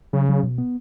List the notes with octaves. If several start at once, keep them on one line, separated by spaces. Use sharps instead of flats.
C#3 F#3
F#3
B2
B3